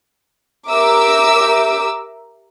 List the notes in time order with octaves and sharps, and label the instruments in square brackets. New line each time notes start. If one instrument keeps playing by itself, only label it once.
[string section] G4 A#4 E5 D6 E6